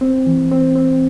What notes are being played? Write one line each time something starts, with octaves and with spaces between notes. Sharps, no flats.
C4
E3
C4
C4